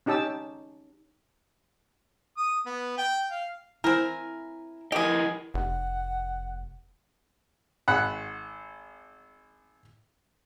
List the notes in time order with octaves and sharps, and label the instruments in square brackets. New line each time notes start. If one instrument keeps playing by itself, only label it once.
[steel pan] C#4 D#4 G4 A5 E6
[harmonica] D#6
B3
G5
F5
[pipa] C4 A#4 [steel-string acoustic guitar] E4 G#5
[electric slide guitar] E4 A#4 D#5 [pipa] G4 G#4
[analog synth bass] F1 [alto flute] F#5
[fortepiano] G#1 F#5 B5